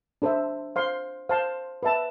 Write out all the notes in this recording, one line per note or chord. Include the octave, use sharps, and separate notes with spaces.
D4 A4 C5 E5
C5 F5 C6
C5 F5 A5 C6
B4 E5 A5